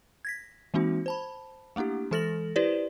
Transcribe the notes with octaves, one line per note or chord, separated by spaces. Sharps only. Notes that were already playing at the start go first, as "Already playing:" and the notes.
G#6 A#6 B6
E3 G#3 A#3 C4 D#4 F#4
C5 A5 B5
A3 A#3 D4 E4 G4
E3 G#3 A4 A6 A#6 F#7
E4 G4 B4 C5 D5